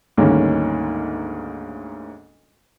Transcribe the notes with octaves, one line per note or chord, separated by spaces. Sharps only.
D2 G#2 D#3 G3 A#3 C#4